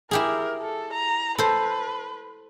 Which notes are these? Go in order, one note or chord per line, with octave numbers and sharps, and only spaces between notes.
E4 G4 G#4 A#4
A4
A#5
A4 B4 C5